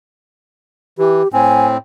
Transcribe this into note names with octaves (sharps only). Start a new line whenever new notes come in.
E3 G4
A2 C4 G#5